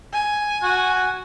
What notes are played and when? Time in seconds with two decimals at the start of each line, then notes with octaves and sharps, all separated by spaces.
0.13 G#5
0.63 F#4